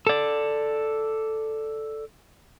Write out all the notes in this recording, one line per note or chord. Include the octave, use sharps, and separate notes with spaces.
A4 D5